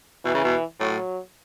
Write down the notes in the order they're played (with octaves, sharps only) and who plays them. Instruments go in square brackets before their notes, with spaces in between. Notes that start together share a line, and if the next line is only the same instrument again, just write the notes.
[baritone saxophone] B2 [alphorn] E3
[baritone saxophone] C#3
B2
[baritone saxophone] A2 [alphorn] F#3